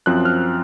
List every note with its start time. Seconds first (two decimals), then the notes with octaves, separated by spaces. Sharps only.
0.06 F#2 F3 C4 F#6
0.25 F6